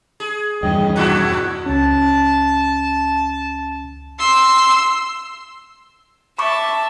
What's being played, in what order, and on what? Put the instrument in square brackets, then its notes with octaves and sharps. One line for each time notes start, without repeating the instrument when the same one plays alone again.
[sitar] G#4
[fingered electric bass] E2 G2 D#3 [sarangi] D#5 [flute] G5
[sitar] A#2 D4 E4 [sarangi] F#4 [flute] F#6
[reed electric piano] C#2 C#4 [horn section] A5
[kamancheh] C6 E6
[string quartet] E5 A5 [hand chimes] B5 C#6 D6